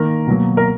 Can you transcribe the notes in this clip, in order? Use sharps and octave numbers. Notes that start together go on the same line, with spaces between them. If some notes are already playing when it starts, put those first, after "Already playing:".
Already playing: D#3 A#3 A#4
B2 F#3 A#3
A#4